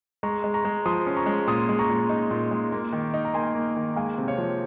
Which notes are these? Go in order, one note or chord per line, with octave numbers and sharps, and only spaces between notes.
G#3 A#5 C#6
G#3
A#5 C#6
G#3
F3 C6 D#6
C#4
A#5 C#6
G#3
A#2 C6 D#6
G#3
A#5 C#6
A#2
D#4
A#2
G#3
A#3
D#3
D#4
A#5
A#3 G#5 C6
A#3
D#3
G#3 F5 G#5
C3
C#5 F5
F3